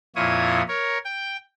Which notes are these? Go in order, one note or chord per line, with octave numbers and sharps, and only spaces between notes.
F2 A#2 E4 F4 C#5 D#6
A#4 C#5
G5